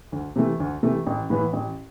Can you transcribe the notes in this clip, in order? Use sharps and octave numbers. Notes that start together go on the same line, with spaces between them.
D2
C3 E3 A3
D2
C3 E3 A3
A1
A2 E3 B3
A1